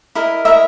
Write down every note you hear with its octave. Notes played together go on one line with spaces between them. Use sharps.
E4 A#4 D#5
E4 A#4 D#5 E5